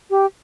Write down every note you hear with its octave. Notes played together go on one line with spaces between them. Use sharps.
G4